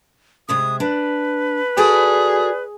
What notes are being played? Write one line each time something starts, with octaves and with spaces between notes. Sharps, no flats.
C3 G#3 E5 D#6
D4 B4
F#4 G#4 A4 D5